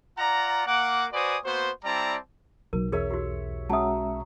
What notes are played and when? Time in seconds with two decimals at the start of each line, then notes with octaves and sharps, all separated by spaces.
0.18 F4 D5 F#5 A#5
0.67 A#3 F#5 D6
1.13 F#4 B4 C5 D5 G#5 D#6
1.45 A#3 B3 F#4 C5
1.84 G3 C4 E4 D5 A5 A#5
2.73 B1 F#3 A#4
2.92 E2 G#4 A#4 C#5 E5
3.11 F#4 G4
3.70 F#3 G#3 C#4 E5 A5 D#6